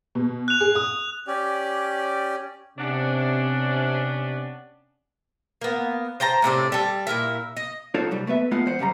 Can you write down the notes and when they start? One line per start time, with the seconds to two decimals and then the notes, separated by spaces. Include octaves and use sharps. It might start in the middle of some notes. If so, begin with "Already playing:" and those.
0.15 B2
0.48 F#6 F7
0.60 G#4
0.75 D#6
1.27 C#4 G4 D5
2.78 C3 B3 C#4 D4
5.61 A#3 B3
6.20 C5 G5 A5 A#5
6.42 A2 C3 C4 D4
6.72 G3 A4
7.07 A#2 E4 A#4 E5
7.57 D#5
7.94 D#4 F4 F#4 A4 C5 C#5
8.11 C2 G3
8.27 A3 B3 B4 E5
8.51 G#3 A3 B3 F4 F#5
8.66 E2 C5 F#5
8.79 F#2 C#3 G3 A#5